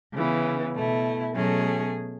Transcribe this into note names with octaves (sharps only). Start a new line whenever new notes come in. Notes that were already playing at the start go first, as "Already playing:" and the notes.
C#3 E3 B3
B2 A3 E4
B2 F#3 A3 C#4 G#4